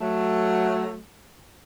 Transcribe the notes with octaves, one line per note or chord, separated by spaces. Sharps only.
F#3 A3